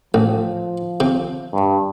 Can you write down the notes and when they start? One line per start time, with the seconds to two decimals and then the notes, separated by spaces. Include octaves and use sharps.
0.14 A1 F3
1.00 C3
1.53 G2